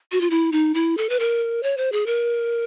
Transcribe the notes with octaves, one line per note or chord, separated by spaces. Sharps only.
F#4
F4
E4
D#4
E4
A4
B4
A#4
C#5
C5
G#4
A#4